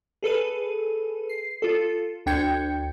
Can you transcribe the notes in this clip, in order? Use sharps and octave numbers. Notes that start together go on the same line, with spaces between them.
G#4 A4 B4 D#7
C7
F4 A4
D2 D4 G5 G6 G#6 C#7